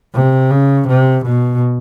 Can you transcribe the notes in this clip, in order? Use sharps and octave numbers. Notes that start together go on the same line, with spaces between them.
C3
C#3
C3
B2